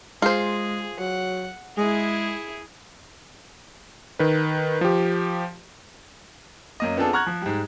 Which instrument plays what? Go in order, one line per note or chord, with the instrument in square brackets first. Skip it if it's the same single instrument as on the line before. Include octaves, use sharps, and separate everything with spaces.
[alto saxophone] G#3 [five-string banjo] F4 C5 [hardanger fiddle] G#4
[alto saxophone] F#3 [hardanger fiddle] F#5
[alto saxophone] G#3 [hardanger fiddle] E4 G#4
[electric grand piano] D#3 B4
F3 G4
[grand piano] F#2 A#3 D#5
B3 C4 D4 F4 G#4 A4
F#5 A#5 C#6 F6 F#6 G#6
F3
G#2 G3